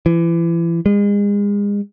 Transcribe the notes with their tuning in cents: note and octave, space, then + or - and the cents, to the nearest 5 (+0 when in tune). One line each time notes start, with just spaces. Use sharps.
E3 +30
G#3 -35